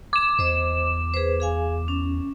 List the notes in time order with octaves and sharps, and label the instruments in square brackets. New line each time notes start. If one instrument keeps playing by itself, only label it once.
[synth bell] D6 E7
[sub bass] E2 [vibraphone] C5 D#5
[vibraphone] G#4 B4 C5
G#4 F5 G#5
C#4